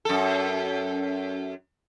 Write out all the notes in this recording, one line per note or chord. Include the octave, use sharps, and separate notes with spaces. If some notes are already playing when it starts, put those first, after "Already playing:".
F#2 A4